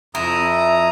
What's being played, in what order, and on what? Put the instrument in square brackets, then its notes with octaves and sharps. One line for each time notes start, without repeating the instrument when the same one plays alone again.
[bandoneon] F2 A#5 D#6 [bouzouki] E4